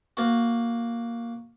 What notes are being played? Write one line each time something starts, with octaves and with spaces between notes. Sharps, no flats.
A#3 F#4